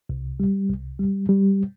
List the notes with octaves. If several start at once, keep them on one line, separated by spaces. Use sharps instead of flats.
C2
G3
C2
G3
G3